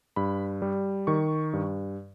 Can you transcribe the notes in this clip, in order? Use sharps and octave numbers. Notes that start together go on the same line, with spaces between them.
G2 B5
G3
D#3 C#6
G2